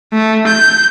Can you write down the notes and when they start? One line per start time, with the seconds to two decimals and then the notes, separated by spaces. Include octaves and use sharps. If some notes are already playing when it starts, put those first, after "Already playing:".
0.14 A3
0.47 G6